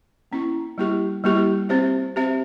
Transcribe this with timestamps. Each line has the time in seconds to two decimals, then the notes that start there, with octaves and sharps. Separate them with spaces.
0.31 A#3 C#4 E4
0.78 G3 A#3 E4 G4
1.24 G3 A#3 E4 G4
1.69 C4 G4 C5 E5
2.16 C4 G4 C5 E5